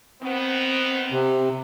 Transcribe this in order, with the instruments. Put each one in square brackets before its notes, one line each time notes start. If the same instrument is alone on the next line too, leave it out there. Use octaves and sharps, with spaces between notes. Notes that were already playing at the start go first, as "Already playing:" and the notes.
[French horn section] D#3 B3 [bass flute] C4
[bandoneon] C3